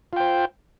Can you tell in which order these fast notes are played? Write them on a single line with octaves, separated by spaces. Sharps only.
F4 G5 C5